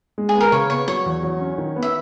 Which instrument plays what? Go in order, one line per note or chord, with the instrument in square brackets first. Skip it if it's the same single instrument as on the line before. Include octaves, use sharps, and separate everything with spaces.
[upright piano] G#3
[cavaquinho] G#4
[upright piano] B3
[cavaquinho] A#4
[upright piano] C#3 [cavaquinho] C#5
[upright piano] B3 [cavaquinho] C#5
[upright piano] F#3 [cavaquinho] C#5
[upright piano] E2
F#3
C#4
D#3
B3
[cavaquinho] E5